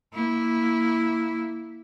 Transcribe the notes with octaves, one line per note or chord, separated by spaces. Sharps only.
A#3 E4